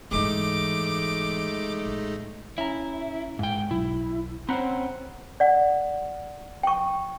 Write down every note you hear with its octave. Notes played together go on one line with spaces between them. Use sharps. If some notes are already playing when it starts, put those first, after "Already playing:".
G#2 E3 G#3 A3 D#4 D6
A1
C#4 E4 A#5
G#2 G5
B1 E4
C4 C#4 C5 F#5 A#5 B5
D5 F#5
G5 C#6